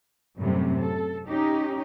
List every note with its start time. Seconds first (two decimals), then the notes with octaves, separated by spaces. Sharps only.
0.37 F#2 A2 C3 G3
0.81 A4
1.29 C#4 D#4 G4